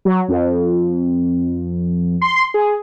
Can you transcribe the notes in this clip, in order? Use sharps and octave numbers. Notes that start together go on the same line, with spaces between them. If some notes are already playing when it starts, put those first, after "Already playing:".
F#3
F2
C6
G#4